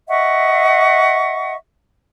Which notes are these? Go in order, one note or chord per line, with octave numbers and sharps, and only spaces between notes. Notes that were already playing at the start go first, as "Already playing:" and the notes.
D#5 E5 F#5 C#6